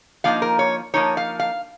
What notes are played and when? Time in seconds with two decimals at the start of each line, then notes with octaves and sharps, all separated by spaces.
0.24 F3 A#3 D#4 F5
0.42 A#4
0.59 C#5
0.94 F3 A#3 D#4 C#5
1.17 F5
1.40 F5